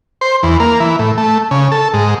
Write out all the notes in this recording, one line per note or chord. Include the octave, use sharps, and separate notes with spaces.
C5
E2
A#3
E3
A2
A3
C#3
A4
G#2